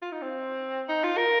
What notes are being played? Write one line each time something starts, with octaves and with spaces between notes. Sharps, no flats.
F4
D#4
C4
D#4
F4
A#4